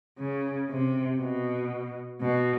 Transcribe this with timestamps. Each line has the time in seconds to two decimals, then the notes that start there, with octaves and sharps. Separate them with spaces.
0.19 C#3
0.70 C3
1.19 B2
2.21 B2